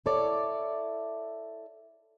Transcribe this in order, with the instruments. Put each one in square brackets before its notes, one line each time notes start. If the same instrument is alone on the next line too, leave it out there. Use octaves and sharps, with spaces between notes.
[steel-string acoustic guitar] E4 A4 C#5 D5